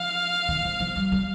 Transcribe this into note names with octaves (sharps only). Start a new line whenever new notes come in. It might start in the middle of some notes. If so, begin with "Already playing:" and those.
Already playing: F3 F5
D#3
F3
F3
G3
G3